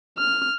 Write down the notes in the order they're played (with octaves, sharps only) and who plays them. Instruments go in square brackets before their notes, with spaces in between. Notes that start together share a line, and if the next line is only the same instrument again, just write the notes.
[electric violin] F6